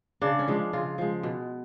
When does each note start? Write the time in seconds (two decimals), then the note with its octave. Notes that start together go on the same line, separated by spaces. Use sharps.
0.21 C#3 D4
0.39 C#4
0.48 F3 G#3 D4
0.73 C#3 F4
0.98 F3 G#3
1.23 B2